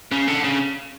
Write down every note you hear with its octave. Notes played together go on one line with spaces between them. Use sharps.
C#3
D3
C#3